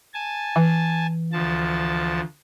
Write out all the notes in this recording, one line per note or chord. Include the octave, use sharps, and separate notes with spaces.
G#5 A5
E3
D2 F3 A5